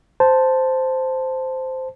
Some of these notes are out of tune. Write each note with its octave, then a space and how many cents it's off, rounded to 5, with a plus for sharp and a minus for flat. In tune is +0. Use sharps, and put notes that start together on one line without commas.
C5 -10 A5 +0